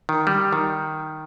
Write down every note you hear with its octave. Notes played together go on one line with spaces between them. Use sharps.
D#3
G3
D#3